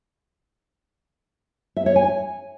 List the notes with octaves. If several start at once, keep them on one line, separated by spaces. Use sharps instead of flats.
E5
C#5
G#5